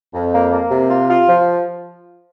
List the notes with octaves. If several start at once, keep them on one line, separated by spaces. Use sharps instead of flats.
F2
A#3
A#3
C3
F4
F4
F3